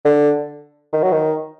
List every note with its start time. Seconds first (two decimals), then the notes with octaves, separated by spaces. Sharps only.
0.05 D3
0.93 D#3
1.03 F#3
1.12 D#3